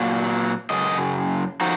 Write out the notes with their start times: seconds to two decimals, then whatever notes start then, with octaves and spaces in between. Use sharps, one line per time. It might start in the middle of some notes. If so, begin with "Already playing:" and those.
Already playing: A#2 F#3
0.70 F#2 C#3 D#5
1.61 F3 D#4 F#4